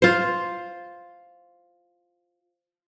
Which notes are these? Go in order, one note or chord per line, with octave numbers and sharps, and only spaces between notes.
F4 C5